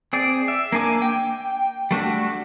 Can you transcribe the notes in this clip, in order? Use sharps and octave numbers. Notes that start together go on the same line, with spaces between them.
C4 G#4 D5
E5
A#3 D4 G#5 D6
G5
G3 A3 D4 F#4